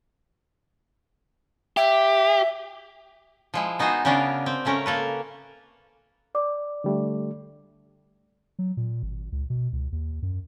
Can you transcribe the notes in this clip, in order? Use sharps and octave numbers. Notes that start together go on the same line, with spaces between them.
G4 E5
F3 G#3 E4
B3 D#4 F#4 G#4 C5
C#3 B3 C#4 D4 A#4
C4
C#3 A3 C#4 A#4
A#3 A4 B4
D5 D6
D3 G3 A3
F#3
A#2
G#1
C#2
B2
C#2
D#2
F#2